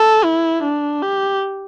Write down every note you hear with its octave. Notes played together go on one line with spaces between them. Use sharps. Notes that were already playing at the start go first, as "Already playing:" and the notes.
Already playing: A4
E4
D4
G4